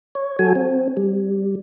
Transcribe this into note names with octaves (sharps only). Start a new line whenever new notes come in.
C#5
F#3 F#4 A4 G#5
C4
G3